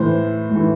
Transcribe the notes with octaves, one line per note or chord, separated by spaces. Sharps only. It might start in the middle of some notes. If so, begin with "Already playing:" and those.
Already playing: A2 E3 C5
A2
E3